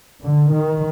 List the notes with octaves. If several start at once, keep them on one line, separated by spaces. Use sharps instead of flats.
D3
D#3